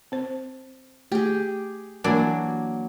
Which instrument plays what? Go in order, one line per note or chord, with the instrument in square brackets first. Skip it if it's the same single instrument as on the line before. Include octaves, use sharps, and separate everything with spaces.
[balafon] C4 C5
[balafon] A3 [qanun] G4 G#4
[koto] E3 D4 [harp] F#3 A#3 [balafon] A#4